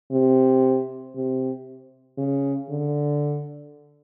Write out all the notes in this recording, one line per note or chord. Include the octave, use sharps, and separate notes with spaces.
C3
C3
C#3
D3